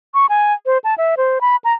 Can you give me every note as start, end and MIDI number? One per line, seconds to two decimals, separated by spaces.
0.14 0.26 85
0.29 0.53 80
0.66 0.78 72
0.84 0.95 81
0.98 1.15 76
1.17 1.39 72
1.41 1.56 83
1.64 1.73 82